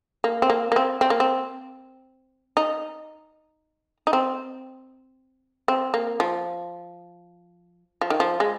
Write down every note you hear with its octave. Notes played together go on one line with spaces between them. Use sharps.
A#3
C4
A#3
A#3
C4
C4
A#3
C4
D#4
D#4
C4
C4
A#3
F3
F3
D#3
F3
G#3